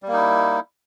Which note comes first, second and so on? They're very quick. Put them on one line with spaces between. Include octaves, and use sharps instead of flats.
G3 A#3 D#4 E4